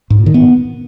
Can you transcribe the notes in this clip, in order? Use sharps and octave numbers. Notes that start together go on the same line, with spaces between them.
G#2
A#2
D#3
B3